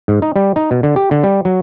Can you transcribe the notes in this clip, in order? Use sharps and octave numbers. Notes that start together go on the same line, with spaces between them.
G#2
D#4
G3
D#4
B2
D3
G4
D3
G3
F#3